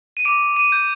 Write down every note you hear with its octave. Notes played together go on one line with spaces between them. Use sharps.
D#7
D6 D7
D#7
G6